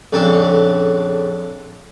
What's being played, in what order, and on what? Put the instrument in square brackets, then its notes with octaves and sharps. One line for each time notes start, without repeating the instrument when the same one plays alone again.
[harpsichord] A#1 F2 C#3 D4 A4